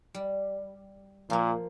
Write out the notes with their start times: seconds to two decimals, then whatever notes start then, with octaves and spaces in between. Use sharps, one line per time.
0.14 G3
1.30 A#2 F3 A#3